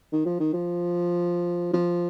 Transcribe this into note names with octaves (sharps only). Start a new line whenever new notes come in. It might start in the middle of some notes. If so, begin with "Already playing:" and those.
D#3
F3
D#3
F3
F3